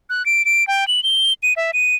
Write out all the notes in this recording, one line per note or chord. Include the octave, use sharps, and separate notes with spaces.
F#6
D7
D7
G5
F#7
G7
D#7
E5
D#7